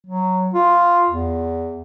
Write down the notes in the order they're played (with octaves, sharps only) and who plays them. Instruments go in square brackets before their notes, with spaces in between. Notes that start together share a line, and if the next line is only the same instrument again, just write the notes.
[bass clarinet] F#3
F4
E2